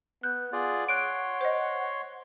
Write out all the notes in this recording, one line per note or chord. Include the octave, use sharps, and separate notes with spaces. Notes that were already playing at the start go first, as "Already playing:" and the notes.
B3 F#6 G6
F4 G#4 D5 F#5
C#5 C6 F#6 D7
C5 D#5